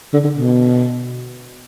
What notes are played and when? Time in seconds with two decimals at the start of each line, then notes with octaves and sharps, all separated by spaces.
0.14 D3
0.24 D3
0.36 B2